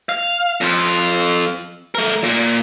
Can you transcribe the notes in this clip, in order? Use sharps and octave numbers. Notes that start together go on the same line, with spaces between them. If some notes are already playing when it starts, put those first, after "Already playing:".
F5
F2 F4
A3 A#4
A#2 A#3